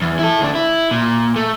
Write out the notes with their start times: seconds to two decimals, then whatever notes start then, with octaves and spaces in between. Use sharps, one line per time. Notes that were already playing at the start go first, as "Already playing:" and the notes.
0.02 E2
0.19 E4 A4
0.41 D2 D4
0.55 E4
0.91 A#2
1.36 A3